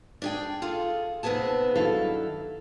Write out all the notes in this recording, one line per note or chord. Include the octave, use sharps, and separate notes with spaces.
D4 G#4 G5
F4 G#4 A4
D#2 C3 A3 B3 G#4 A5
G2 D#3 F#3 E4 A4 F5